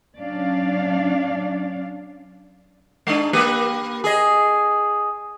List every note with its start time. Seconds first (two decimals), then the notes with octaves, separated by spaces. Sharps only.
0.17 F#3 C#4 D4 D5 F5
3.07 G#3 D4
3.33 A#3 G4 B4
4.04 G#4 D#5